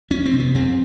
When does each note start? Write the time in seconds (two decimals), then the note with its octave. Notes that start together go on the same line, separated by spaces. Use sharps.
0.10 F2 C#4
0.26 C4
0.33 C3
0.40 B3
0.54 F2 C4